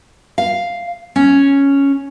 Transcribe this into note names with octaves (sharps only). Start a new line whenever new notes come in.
F5
C#4